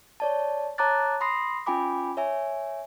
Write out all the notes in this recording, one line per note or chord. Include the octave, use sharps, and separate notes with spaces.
C#5 D5 A5
C#5 A5 A#5 D6 F#6 A6
B5 C6 D#6 A#6 C7
C#4 F4 G5 G#5 B5 D6
C#5 E5 G#5